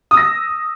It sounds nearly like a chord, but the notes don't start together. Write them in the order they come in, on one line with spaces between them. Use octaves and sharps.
D#6 E6 A#6